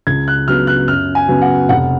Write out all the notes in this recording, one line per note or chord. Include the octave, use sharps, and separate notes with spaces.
C#2 G#6
F#6
C#3 F#3 B3 F6
F#6
F#2 F6
G#5
C#3 F#3 B3
F#5
F1 F#5